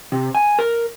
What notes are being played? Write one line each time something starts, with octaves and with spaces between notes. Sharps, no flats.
C3
G#5
A#4